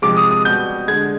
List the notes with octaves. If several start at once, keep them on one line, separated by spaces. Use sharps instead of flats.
C3 F3 G#3 D6
D#6
D#6
B2 G3 G6
D3 G#3 G#6